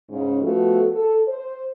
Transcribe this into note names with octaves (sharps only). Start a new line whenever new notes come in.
G#2 C#3
F3 A3 B3 F#4
A4
C5